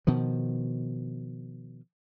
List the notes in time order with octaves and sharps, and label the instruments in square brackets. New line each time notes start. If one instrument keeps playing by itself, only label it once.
[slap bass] B2 D#3 F3